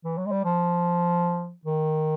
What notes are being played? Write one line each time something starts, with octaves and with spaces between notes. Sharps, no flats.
E3
F#3
G#3
G3
F3
D#3